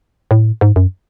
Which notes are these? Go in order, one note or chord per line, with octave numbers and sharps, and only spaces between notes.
A2
G#2
F#2